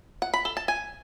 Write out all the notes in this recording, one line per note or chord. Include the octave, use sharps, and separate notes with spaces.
F#5
B5
A4
A5
G#5